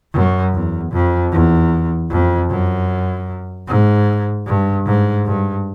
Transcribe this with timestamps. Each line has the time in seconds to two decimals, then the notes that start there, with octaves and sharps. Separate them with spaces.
0.13 F#2
0.53 E2
0.92 F2
1.32 E2
2.10 F2
2.49 F#2
3.67 G#2
4.46 G2
4.86 G#2
5.25 G2